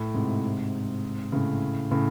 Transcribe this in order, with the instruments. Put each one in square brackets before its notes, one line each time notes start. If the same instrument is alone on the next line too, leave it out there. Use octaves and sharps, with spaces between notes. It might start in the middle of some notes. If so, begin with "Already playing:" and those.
Already playing: [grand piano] A2
G#2 C3
A2 C#3
A2 C#3